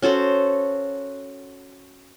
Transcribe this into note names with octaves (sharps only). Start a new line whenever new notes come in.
C#4 F#4 A4 C5